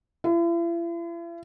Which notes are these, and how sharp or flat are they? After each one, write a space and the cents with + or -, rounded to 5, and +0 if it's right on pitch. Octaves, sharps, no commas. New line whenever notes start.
E4 +45